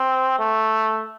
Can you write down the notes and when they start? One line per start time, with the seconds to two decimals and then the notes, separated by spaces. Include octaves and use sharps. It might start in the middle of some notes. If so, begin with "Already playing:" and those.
Already playing: C4
0.39 A3